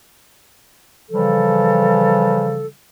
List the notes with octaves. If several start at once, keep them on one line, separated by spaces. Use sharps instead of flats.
C#3 E3 F3 G3 A4